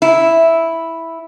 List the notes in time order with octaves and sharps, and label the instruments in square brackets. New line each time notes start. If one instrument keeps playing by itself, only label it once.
[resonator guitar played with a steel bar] E4